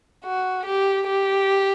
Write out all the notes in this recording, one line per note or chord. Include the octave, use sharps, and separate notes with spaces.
F#4
G4
G4